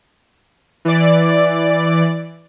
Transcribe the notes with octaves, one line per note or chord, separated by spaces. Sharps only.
E3 D5